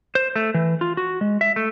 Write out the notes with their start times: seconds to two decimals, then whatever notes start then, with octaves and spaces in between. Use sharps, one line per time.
0.15 C5
0.36 A3
0.54 E3
0.81 F4
0.97 F#4
1.21 G#3
1.41 E5
1.56 A3